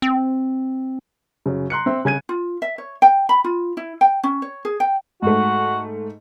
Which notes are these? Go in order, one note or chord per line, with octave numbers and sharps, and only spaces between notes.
C4
F#2 C#3
A#5 C6 F#6 C#7
C4 E5 C6
C#3 G#5 G#6 D#7
F4
E5
C#5
G5
B5
F4
E4
G5
C#4
C#5
G#4
G5
G#2 A3 F#4